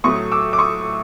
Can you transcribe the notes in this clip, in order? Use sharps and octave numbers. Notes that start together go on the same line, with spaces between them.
A2 F#3 A3 C#6 D#6
D6 E6
D6
C#6 D#6